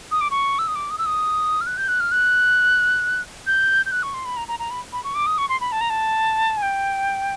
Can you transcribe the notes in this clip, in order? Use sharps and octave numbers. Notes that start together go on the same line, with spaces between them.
D#6
D6
C#6
E6
D#6
D6
D#6
E6
D#6
F6
F#6
G6
F#6
F6
F#6
G6
G6
F#6
C#6
C6
B5
A#5
A#5
A#5
B5
B5
C#6
D6
D#6
C#6
C6
B5
A5
A#5
A5
G#5
G5